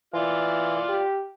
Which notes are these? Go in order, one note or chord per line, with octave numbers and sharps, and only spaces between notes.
E3 F4 D5 F6
G4